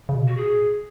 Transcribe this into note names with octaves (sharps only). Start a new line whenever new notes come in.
C#3
B2
F#4
A2 G#4